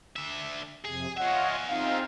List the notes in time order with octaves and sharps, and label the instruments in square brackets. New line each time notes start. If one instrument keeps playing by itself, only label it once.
[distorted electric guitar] D3 E5
[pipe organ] F2 C3 [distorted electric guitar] G#4
[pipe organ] F4 C#5 D#5 [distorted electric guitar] G#4 E5 [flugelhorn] F#5
[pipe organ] C4 D#4 F4 [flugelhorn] F5